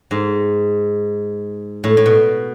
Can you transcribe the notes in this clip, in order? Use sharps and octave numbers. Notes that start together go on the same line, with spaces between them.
G#2
A2
A2
B2